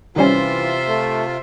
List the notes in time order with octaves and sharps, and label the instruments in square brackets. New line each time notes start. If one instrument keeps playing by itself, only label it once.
[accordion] C3 F4 [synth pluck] D#3 G3 C#4 [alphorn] E3 [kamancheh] C5 E5
[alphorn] A3